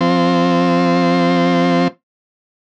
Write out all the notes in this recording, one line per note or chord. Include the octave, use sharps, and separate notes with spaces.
F3 C4